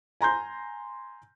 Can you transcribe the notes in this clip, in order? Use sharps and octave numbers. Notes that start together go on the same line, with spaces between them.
G#5 A#5 C6 G6